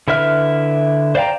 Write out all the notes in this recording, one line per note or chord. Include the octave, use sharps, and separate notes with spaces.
D3 E4 B4 E5 F6
C5 D5 F5 G5 A#5